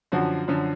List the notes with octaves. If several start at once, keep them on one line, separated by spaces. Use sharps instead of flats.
F#2 D3 F3 F#4
F#2 D3 F3